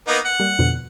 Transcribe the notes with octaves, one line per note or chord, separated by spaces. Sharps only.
A#3 B3 D#4
F#5
G3 A#3
F2 B2 D3